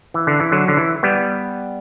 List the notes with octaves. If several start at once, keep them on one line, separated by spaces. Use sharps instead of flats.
E3
D3
E3
D3 F#3
D3
E3
G3 B3